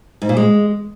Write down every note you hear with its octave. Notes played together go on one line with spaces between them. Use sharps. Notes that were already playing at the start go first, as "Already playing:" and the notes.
G#2
A#2
G#3